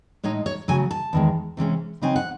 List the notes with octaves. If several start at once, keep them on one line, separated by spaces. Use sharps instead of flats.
A2 G#3 D#4 C#5
C#5
C#3 F#3 A3 G#5
A5
E2 D#3 G#3
C3 E3 G#3 C#4
C#3 F#3 C4 D#4 G#5
F#5